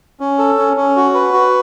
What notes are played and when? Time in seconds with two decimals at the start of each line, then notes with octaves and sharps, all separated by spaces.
0.20 C#4
0.38 A4
0.58 C#4
0.77 C#4
0.96 F#4
1.14 B4
1.33 F#4